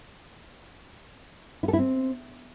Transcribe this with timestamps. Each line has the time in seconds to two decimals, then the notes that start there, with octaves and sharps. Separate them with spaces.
1.63 E4
1.68 A4
1.73 E4
1.79 C4